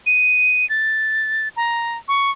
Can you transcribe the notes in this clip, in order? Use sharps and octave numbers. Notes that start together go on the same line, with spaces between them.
D#7
A6
A#5
C#6